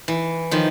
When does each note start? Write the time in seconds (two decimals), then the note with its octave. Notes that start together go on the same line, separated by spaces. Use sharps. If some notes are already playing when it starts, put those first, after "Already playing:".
0.08 E3
0.51 D#3 F3